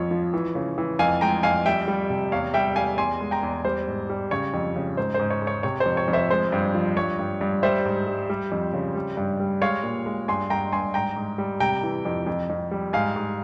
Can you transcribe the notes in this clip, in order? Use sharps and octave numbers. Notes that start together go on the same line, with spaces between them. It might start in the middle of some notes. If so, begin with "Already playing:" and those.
Already playing: F2 F3 C#5
F3
E3
C#3
E3
F2 F5 G#5
G#3 G5 A#5
F2 F5 G#5
G3 E5 G5
G3
C3
E2 C#5 F5
G3 E5 G5
E2 F5 G#5
E2 G#5 C6
G#3
G5 A#5
E2
G3 C5
G#2
G3
C#3 C#5
F2
C#3
G#2 C5
G#2 C5
C#5
G#3
C#5
C3 C#5
C5
F2
C#5
F2
C5 E5
G#3 C5
G2
F3
G2 C#5
G2
G2
G3 C5 E5
G#2
G3
G3
F2
C#3
G3
G2
G3
G#3 C#5 F5
A#2
G#3
G2 G#5 C6
G2 G5 A#5
G2 G#5 C6
G#2 G5 A#5
G#2
G3
C3 G5 A#5
E3
F2
F2
F2
G3
G#2 F5 G#5
G#2